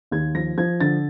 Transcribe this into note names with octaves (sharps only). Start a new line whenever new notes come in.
D#2 G#6
F3 A#6
F3 G#6
D3 A6